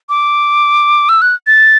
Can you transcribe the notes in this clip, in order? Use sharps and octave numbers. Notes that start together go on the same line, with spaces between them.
D6
E6
F#6
A6